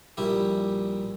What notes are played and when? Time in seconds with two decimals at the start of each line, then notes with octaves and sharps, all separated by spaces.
0.17 A#1 G3 E4 G4